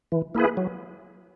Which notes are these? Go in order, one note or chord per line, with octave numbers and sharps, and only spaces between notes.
E3
A#3 E4 G#4 B4
F#3